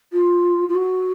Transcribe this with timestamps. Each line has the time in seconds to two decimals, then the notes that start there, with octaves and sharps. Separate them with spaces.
0.12 F4
0.68 F4
0.74 F#4